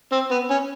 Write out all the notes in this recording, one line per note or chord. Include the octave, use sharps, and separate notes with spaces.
C4
B3
C#4